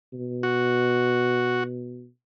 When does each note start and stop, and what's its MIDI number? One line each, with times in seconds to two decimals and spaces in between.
0.13 2.08 47
0.43 1.64 66